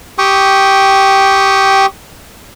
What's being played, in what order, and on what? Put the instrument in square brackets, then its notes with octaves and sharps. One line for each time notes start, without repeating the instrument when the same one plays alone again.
[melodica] G4 G5 C#6 D#6